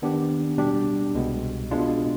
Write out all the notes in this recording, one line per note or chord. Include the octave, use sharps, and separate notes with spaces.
D#3 B3 D4 G4
B2 G3 D4 G4
C2 B2 G#3 B3
B2 G#3 D4 F4